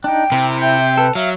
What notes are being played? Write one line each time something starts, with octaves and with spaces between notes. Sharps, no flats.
D4 D#4 G5
C3 C4 E4 A#4
E5 G5
A4 B4
F#3 E5 F5